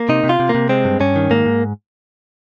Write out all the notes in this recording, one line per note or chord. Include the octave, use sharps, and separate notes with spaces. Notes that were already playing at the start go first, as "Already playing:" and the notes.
Already playing: A#3
C3 D#4
C3
F4
C3
A#3
C3
G#3 C4
G2
G2 C#4
D#3
G#2 A#3
G#2